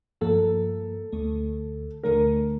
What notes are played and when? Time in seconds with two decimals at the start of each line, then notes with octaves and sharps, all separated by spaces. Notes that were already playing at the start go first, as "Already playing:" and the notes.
0.21 G2 F3 A#3 A4
1.12 D2 D3 A3
2.03 D2 D3 A3 A#4